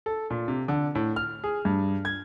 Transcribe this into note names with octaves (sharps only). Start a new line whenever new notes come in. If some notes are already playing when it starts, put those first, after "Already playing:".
A4
A#2
C3
D3
A2
F6
G#4
G2
G#6